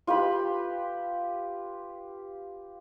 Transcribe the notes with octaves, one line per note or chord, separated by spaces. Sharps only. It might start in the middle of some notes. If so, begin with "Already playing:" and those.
F4 G4 B4 B5